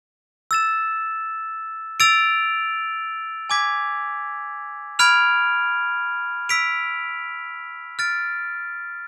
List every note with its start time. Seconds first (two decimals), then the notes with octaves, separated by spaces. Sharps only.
0.51 E6 A6 E7
2.00 E6 A6 D7 F7
3.50 G#5 D6 G#6 B6
4.99 B5 F6 G#6 D7 F7
6.49 E6 B6 D7 F7
7.99 F6 A6 D7